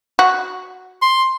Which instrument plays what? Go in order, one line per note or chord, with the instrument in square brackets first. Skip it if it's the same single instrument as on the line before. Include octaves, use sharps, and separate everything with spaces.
[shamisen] F#4
[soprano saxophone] C6